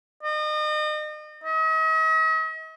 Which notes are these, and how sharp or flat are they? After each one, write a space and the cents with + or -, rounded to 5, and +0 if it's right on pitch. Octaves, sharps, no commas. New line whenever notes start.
D#5 -35
D#5 +45